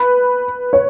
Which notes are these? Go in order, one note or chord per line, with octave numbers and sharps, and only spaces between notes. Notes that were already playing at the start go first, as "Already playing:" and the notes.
Already playing: B4
C#5